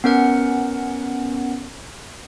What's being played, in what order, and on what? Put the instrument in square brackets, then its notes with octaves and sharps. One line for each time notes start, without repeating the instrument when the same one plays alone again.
[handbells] B3 C#4 A#4 F#5